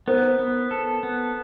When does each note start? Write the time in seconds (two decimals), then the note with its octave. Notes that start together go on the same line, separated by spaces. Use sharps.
0.07 B3 A#4 C5
0.39 B3
0.71 A4
1.03 B3